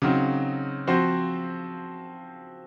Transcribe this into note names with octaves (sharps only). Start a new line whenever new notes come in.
C#3 F#3 C4 D#4
F3 C4 F#4 C5